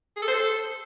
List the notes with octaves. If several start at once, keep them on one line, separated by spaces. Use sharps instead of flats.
G#4
A4
C5
A4